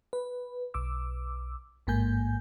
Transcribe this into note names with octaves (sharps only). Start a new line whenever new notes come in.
B4
B1 D6 E6
A1 G#2 A#3 G#5 G6